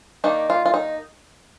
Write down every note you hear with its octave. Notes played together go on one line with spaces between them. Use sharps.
D#3 A#3 D4 D#4
F4
F4
D#4